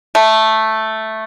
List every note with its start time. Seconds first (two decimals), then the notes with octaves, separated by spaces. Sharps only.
0.15 A3